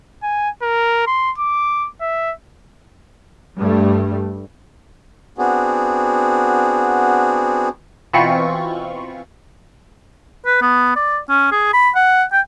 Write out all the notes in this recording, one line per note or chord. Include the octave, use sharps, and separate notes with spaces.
G#5
A#4
C6
D6
E5
G2 G3 A3
B3 C4 D4 F#4 G#4
B2 E3 C4 F4 B5 C#6
B4
B3
D5
C#4
G#4
B5
F#5
G5